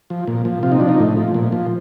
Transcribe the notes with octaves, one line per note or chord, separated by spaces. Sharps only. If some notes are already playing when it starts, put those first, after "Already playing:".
F3
A#2
F3
C3 F4
D#4
F3 D4
D#4
A2
F3
A#2
F3